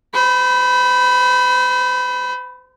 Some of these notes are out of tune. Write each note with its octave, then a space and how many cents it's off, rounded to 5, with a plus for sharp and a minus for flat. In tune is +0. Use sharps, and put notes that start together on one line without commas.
C5 -35 B5 +0